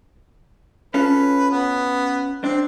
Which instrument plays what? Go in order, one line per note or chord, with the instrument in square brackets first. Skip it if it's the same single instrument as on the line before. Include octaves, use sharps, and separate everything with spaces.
[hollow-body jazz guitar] C#4 F4 A4 [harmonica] B4
[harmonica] B3
[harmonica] C4 [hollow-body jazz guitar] D4